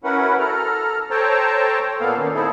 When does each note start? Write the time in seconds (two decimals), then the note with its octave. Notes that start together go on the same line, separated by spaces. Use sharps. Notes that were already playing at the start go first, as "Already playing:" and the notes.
0.04 C#4 E4 F#4 A#4 B4 F#5
0.39 A4 A#5 F6
1.10 A4 C5 C#5 G5 A5 A#5
2.00 A#2 A#3 B3 A4 F5
2.17 D#3 A#3 C#4
2.34 C4 D#4 E4 G#4 A4